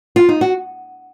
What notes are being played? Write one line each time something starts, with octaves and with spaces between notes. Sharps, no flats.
F4
D#4
F#4